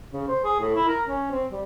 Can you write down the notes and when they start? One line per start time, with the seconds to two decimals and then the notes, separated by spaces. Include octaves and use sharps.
0.11 C#3
0.28 C5
0.44 G#4
0.59 A2
0.75 E4
0.88 A#4
1.05 C#4
1.31 C4
1.51 G3